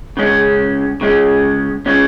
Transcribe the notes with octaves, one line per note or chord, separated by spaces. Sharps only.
C#3 G#3 C#4
C#3 G#3 C#4
C#3 G#3 C#4